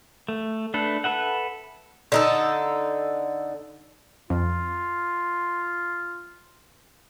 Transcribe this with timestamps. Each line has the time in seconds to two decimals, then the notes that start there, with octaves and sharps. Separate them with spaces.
0.29 A3
0.74 A3 D4 A4 B4
1.04 A4 B4 E5 F#5
2.12 D3 D#4 A4
4.30 F2 F4